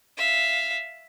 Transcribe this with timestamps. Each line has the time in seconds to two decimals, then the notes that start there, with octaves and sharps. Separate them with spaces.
0.17 E5 F5